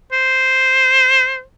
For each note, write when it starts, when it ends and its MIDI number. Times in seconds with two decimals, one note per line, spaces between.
0.12 1.42 72